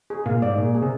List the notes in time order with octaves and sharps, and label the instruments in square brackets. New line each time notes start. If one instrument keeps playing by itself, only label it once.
[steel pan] G#4
[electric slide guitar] A#2 [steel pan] F5
[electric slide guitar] G#2 [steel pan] D5
[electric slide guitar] A#2 [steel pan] G#4
[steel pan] G#4
[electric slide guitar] C3